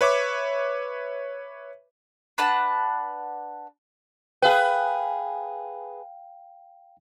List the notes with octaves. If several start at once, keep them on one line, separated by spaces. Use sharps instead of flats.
B4 C#5 E5 D6
D4 B4 F#5 A5
G#4 B4 F5 G5